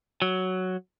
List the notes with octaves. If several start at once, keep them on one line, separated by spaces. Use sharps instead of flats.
F#3